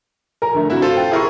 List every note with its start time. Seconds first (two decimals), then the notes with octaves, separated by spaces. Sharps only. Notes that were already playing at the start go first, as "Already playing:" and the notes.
0.42 A#4 G#5 A#5
0.54 D3 A3
0.70 G2 C3 E4 F#4 E5
0.82 F4 A4 C5
0.97 G5
1.12 E4 G4 G#4 A#4 C#6